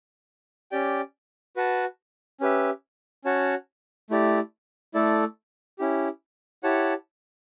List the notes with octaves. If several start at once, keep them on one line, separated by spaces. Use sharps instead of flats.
C#4 G4 D5 G5
F#4 B4 F#5 A5
C#4 G4 B4 E5
C#4 F#4 C#5 F#5 A5
A3 E4 G4 D5
A3 E4 A4 D5
C#4 E4 G4
E4 G4 C#5 F#5 A5